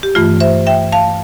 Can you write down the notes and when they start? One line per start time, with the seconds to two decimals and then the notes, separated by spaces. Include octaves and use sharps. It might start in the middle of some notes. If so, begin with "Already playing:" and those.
0.03 G4
0.15 G2 E3 A3 F4
0.40 C5 E5
0.67 E5 G5
0.92 F5 A5